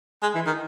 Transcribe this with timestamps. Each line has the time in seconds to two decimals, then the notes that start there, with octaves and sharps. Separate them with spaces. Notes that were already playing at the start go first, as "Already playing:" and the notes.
0.23 G#3
0.35 E3
0.46 D#3